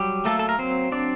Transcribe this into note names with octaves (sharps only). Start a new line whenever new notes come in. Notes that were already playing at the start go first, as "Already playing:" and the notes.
Already playing: F#3 G3 G4
A3 A#3 A4
A4
A#4
F#3 C4 C5
C4 D4 D5